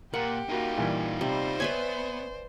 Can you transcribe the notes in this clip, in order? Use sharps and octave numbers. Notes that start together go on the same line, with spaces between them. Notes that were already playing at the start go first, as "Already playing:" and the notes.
A#2 F4 G4 A#4 F#5
A#3 D#4 F4 F#4
A#2 E3 G3
C3 G3 C5 D5
B3 B4 C#5 E5 G#5